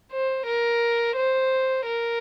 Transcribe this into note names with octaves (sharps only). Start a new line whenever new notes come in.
C5
A#4
C5
A#4